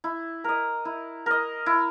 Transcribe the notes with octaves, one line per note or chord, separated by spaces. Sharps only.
E4
A#4 D#5
E4
A#4 D#5
E4